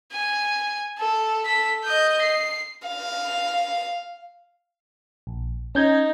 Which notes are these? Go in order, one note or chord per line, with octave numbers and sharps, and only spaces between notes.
G#5
A4
A4 B6
D#5 G6
C7
F5
A#1
C#4 D#4 G6 G#6